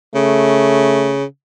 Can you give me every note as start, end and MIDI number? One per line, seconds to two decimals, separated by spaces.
0.14 1.24 49
0.14 1.16 57